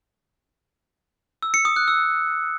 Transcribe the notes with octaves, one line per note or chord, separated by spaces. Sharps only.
E6
C#7
D#6
F#6
E6